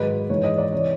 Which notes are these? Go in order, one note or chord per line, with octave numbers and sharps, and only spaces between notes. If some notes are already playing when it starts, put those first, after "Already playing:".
Already playing: G#2 D#3 F#3 B4
G#2 E3 C#5
D#5
D5
C3 E3 C#5